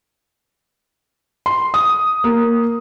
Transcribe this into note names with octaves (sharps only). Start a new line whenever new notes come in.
C6
D#6
A#3